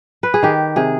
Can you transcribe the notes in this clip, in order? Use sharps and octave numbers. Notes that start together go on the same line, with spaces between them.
B4
G#4
D#3 G4
C3 G#4